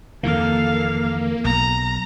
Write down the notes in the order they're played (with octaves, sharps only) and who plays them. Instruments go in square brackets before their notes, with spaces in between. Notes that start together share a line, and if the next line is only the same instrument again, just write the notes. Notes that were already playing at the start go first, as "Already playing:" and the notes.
[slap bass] F2 D#3 E3 [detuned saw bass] A#3 [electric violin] A4 F5
[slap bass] B1 [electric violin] A#5